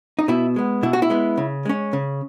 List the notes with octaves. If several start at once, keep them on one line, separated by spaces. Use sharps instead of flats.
D#4
B2 E4
G#3 B3
B2 E4
F#4
E4
G#3 B3
C#3
G#3 C#4
C#3